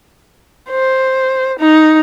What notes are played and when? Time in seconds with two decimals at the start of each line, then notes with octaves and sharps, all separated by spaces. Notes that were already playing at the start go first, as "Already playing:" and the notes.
0.70 C5
1.59 D#4